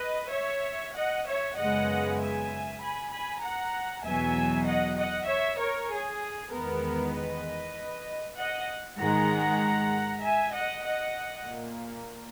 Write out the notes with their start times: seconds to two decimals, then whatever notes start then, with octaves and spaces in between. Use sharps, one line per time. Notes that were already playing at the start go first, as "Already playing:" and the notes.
Already playing: B4 D#5
0.34 C#5 E5
0.97 D#5 F#5
1.26 C#5 E5
1.57 F#2 C#3 G#3 B3 D#5 F#5
2.20 E5 G#5
2.82 G#5 B5
3.12 G#5 B5
3.42 F#5 A#5
4.04 E2 B2 F#3 E5 G#5
4.66 D#5 F#5
4.97 D#5 F#5
5.28 C#5 E5
5.59 A#4 C#5
5.90 G#4
6.51 E2 D#3 G#3 B3 A#4
7.13 B4 D#5
8.37 D#5 F#5
8.99 G#2 D#3 G#3 F#5 A#5
10.22 E5 G#5
10.53 D#5 F#5
10.84 D#5 F#5
11.47 A#2 A#3